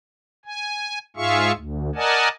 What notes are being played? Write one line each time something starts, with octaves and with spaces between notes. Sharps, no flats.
G#5
G#2 F4 G#4 E5 F5 C#6
D2
A#4 D5 D#5 F#5 G#5 A5